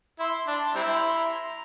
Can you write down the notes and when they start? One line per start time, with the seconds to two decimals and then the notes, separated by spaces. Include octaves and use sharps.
0.19 E4 C6
0.47 D4 A5
0.75 G3 C4 E4 A#5
0.85 C6
0.95 A#5
1.06 C6
1.16 A#5